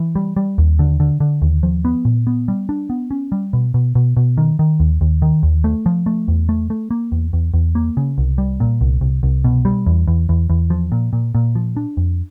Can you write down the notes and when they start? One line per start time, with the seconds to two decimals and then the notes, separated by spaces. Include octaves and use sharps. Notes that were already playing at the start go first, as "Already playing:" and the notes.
Already playing: E3
0.15 G3
0.36 G3
0.58 D#2
0.79 D3
1.00 D3
1.20 D3
1.42 D#2
1.63 F3
1.85 B3
2.05 A#2
2.27 B3
2.48 G3
2.69 D4
2.90 B3
3.11 C#4
3.32 G3
3.53 B2
3.74 B2
3.95 B2
4.17 B2
4.38 D#3
4.59 D#3
4.80 D#2
5.01 D#2
5.22 D#3
5.43 D#2
5.64 A3
5.86 F3
6.06 A3
6.28 E2
6.49 A3
6.70 A3
6.91 A#3
7.12 E2
7.33 E2
7.54 E2
7.75 A#3
7.97 C#3
8.18 C2
8.38 G3
8.60 A#2
8.81 C2
9.01 C2
9.23 C2
9.44 B2
9.65 G3
9.86 E2
10.08 E2
10.29 E2
10.50 E2
10.70 F3
10.92 A#2
11.13 A#2
11.35 A#2
11.55 F3
11.77 D4
11.97 F2